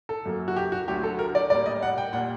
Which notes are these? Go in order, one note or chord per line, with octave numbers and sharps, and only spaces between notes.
A4
F#2 F#3 A#3
F#4
G4
F#4
D2 D3 F#3 G4
A4
A#4
D5
A2 G3 A#3 D5
D#5
F#5
G5
A#2 G3 A#3 F#5